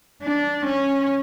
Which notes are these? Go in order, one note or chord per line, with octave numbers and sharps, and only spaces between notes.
D4
C#4